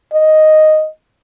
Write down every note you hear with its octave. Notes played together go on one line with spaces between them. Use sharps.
D#5